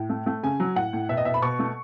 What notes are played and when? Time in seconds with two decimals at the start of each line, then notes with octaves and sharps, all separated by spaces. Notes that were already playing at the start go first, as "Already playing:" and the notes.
Already playing: A2
0.09 A3
0.26 A3
0.43 C#3 G#5
0.60 F#3
0.76 A2 F#5
0.93 A2
1.09 B2 E5
1.17 D#5
1.25 B2 E5
1.34 B5
1.42 B2 C#6
1.59 A3